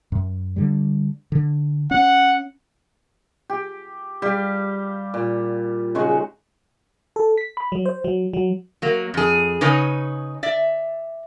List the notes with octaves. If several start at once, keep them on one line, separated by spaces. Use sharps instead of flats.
F#2
D3 G3
D3
C#4 F#5
G4
G3 G4 F5
A#2
C#3 G#3 D#4 F#4
A4
B6
B5
F#3
C5
F#3
F#3
F#3 A#3
F2 G#4
C#3 D#4 B4 C#5 G#5
D5 E5